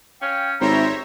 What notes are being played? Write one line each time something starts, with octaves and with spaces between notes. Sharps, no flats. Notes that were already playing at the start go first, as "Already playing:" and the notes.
C#4 C#5 F5 G5
G#1 G3 C5 C#5 E5 A#5